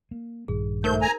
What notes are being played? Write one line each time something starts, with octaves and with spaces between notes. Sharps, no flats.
A#3
A#1 G2 D#3 G#4
G#2 A3 D#4 A#4 C5 G6
G#5 A#5